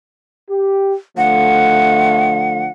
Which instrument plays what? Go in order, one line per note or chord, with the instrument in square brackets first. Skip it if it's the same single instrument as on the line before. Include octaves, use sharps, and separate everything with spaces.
[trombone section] G4
[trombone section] D3 F3 A3 [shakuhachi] F#5